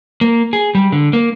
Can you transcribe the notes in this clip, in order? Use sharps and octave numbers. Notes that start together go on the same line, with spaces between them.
A#3
G#4
G3
D3
A#3